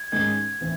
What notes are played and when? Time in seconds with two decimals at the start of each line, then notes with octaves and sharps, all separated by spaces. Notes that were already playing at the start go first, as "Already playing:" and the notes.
Already playing: G#6
0.12 G#2 D#3 G#3 C#4 G#6
0.61 A2 E3 C4